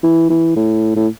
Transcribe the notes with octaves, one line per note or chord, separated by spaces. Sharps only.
E3
E3
A2
A2